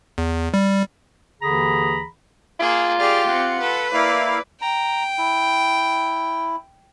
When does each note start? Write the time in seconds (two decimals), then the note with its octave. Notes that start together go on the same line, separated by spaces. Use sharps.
0.18 E2
0.54 G3
1.42 D#2 D3 E3 G#4 A#5 B5
2.60 A#3 F4 G#4
2.99 G4 G#4 D5 F6
3.28 C4 F#5
3.61 A4 B4
3.93 A#3 E4 D5 F5
4.61 G5 A#5
5.18 E4